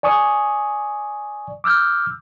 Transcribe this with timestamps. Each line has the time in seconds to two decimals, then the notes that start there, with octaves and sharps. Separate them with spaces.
0.03 D5 G#5 C#6 D#6
1.64 D6 E6 F6 G6